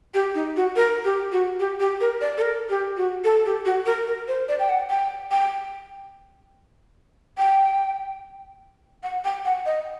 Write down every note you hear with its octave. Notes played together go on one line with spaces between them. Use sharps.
G4
D#4
F#4
A#4
G4
F#4
G4
G4
A#4
D5
A4
A#4
G4
F#4
A4
G4
F#4
A#4
A#4
C5
D5
G5
F#5
G5
G5
G5
F#5
G5
F#5
D#5